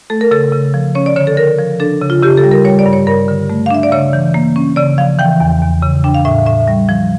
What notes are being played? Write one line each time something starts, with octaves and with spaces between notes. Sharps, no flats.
A3 A4
A#4
C#3 A4
C#3
F3
C#4 C#5
D5
D3 C#5
A4
D3 A#4
F3
D4 A4
C#3
F4
C#3 G4
A4
G3
A#4
G3 C#5
D5
G2
C#5
G2 A#4
D3
A3
F5
D4 E5
D5
C#3 C#5
E3
A#3
C#4
C#3 D5
F3 F5
E3 G5
E2
E2
C#3
D4 G5
F5
A2 E5
A2 E5
G3
F3